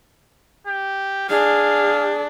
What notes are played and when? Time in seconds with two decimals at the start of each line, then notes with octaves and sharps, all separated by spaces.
0.67 G4
1.29 D4 G#4 F5